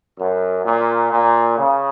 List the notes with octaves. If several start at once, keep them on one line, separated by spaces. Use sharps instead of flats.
F#2
A#2
A#2
C#3